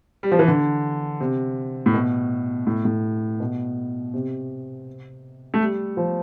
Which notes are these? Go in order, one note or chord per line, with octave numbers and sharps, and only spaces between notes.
G3
F3
E3
D3
C3
A2
B2
A2
A2
B2
C3
A3
G3
F3